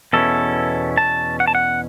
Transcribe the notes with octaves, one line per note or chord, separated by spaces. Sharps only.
E2 B2 A3 C#4 E4 A4
A5
F#5
A5
F#5